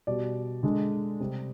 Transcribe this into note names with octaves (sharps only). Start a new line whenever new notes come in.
B2 G3 D5
D3 G#3
C3 G3